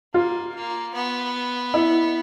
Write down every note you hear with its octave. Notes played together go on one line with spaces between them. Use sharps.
A#3 F4
A#3
B3
E4